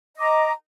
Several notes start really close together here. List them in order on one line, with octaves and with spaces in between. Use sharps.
D#5 D6 A#5